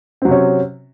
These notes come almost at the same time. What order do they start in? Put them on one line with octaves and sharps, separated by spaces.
C4 F#3 C3 C#4